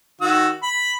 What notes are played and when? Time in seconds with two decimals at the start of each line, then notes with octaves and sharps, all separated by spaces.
0.21 D#3 F#4 E6
0.63 B5